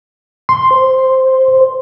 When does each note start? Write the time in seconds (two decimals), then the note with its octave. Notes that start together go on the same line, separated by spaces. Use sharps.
0.49 C6
0.71 C5